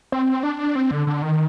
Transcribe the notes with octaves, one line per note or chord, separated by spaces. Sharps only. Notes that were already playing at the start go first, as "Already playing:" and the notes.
C4
D4
C4
D3
D3
D#3